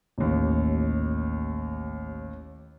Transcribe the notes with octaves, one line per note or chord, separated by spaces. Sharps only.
A1 D#2